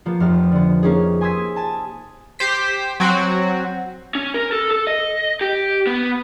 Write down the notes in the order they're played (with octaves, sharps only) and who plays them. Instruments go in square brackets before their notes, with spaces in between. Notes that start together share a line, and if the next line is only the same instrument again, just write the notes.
[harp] F3 A#3 B3
F1 F2 F6
D3 B3
A#3 C#4 D#4 G#4
G#5 C6 D#6 E6 G#6 B6
G#5 A5
[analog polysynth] G4 C5 B6
F#3 C4 F#4
[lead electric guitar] C#4
A#4
A4
A4
D#5
G4
B3